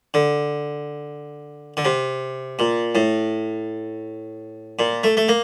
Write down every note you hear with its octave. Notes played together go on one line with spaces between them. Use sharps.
D3
D3
C3
A#2
A2
A#2
A3
A3
A#3